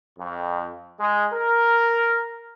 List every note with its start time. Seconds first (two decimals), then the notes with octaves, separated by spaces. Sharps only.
0.18 F2
1.00 G#3
1.33 A#4